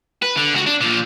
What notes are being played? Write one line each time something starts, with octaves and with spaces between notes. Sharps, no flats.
B4
D3
C#2 F#4
D4
A#2 F3